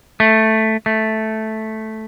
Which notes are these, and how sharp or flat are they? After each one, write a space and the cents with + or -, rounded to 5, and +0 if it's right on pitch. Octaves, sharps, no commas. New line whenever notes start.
A3 +0
A3 -5